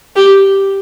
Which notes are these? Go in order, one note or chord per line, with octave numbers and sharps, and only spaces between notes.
G4